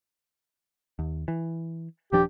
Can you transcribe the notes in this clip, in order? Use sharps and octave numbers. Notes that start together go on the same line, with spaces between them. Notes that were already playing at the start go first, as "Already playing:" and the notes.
D#2
E3
D#1 F3 D4 G4